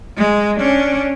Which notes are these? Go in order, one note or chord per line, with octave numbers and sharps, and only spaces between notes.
G#3
C#4 D4